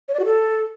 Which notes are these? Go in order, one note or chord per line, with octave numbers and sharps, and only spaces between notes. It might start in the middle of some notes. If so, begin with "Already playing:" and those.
C#5
D5
F#4
A4